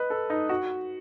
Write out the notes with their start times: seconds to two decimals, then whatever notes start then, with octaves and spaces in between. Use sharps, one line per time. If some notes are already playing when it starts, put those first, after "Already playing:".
Already playing: B4 D#5
0.10 A4
0.30 D#4
0.49 F#4